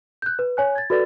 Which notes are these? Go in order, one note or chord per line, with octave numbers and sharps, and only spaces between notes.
F#6 G6
B4
C#5 G#5 F#6
G#6 A6
F#4 A4 B4 D5 A6